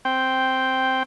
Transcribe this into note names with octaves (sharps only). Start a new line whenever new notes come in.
C4 G5